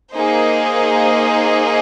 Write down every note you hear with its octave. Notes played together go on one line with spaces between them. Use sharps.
A#3 D#4 G#4 C5